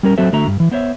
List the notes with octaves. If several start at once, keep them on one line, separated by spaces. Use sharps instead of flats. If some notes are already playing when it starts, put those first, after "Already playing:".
G3 C#4 A#4
F#3 C4 F#4 A4 C5 E5
D3 A3 F#4 E5 A#5
G2
E3
B3 C5 C#5 E5